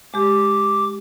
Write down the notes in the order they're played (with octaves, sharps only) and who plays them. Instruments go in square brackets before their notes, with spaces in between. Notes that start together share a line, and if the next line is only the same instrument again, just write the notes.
[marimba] G#3 G4 [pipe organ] D6